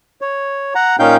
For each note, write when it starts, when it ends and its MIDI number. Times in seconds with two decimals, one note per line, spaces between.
0.21 0.73 73
0.75 0.96 78
0.75 0.96 82
0.99 1.17 46
0.99 1.17 61
0.99 1.17 63
0.99 1.17 77
0.99 1.17 79
0.99 1.17 91